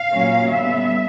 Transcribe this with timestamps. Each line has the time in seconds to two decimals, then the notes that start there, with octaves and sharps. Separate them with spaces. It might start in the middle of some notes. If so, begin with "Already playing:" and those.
Already playing: F5
0.13 A#2 F#3 A#3 C#4
0.51 D3 G3 B3 E5